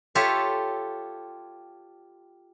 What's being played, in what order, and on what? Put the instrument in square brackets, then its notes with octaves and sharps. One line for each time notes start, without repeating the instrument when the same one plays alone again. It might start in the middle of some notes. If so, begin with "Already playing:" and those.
[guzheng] F4 G4 A4 C#5 E5